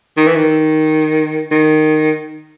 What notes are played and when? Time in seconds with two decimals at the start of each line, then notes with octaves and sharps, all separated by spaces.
0.17 D#3
0.27 E3
0.35 D#3
1.51 D#3